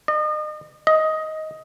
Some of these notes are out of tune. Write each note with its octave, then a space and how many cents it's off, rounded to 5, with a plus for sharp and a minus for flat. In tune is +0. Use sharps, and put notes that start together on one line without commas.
D#5 -40
D#5 +10